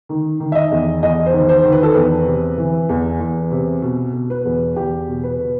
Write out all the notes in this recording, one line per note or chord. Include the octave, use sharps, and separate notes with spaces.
D#3
D#3
E5
D#5
E2
E2 D#5
C5
D#3
C5
D#3
B4
A4
E2 B4
C3
E3
E2
E2
C3
B2
B2
B4
E2
E2 G4
B2
B4
B2